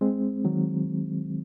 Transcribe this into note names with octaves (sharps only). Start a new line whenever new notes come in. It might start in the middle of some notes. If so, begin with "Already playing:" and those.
G#3 C4
D#3 F#3